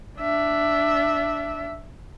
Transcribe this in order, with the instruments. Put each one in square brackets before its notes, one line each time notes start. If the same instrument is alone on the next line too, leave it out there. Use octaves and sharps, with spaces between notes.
[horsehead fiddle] D4 E5